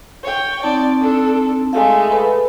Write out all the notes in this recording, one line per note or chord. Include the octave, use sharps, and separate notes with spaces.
C#5 G5
C4 D#4 D5 A5
D4 A4
G#3 A3 F5
A4 B4 B5